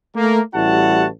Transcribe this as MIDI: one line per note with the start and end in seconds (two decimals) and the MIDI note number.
0.16 0.40 57
0.16 0.40 58
0.55 1.07 33
0.55 1.07 55
0.55 1.07 64
0.55 1.07 66
0.55 1.07 78
0.55 1.07 81